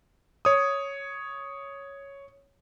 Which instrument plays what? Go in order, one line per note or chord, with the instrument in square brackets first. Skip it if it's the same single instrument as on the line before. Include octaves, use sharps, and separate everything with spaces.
[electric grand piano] C#5 D#6